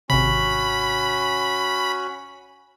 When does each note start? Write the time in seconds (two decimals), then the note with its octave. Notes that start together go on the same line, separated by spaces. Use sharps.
0.10 G#1 C3 C#4 F#4 B5